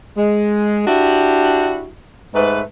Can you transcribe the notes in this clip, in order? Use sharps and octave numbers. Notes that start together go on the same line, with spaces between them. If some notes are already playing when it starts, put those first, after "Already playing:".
G#3
D4 E4 F#4 G4
G#2 A3 B4